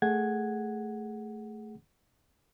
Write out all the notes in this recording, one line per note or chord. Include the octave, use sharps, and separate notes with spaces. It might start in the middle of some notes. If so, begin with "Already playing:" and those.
A3 G#4 F#5 G#6